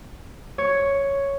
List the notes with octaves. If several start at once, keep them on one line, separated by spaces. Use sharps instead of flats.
C#5